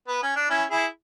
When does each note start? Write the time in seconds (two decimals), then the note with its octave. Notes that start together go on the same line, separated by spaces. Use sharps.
0.08 B3
0.23 C#4
0.36 D4
0.50 C#4 E4
0.70 E4 G#4